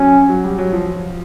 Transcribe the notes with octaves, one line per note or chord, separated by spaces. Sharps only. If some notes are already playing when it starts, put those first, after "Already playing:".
Already playing: F#3 C#4
F#3
G3
F#3
F3